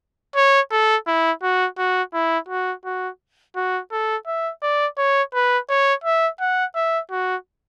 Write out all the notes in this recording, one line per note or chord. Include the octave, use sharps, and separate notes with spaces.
C#5
A4
E4
F#4
F#4
E4
F#4
F#4
F#4
A4
E5
D5
C#5
B4
C#5
E5
F#5
E5
F#4